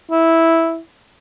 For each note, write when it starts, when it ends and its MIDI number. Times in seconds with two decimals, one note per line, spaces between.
0.11 0.79 64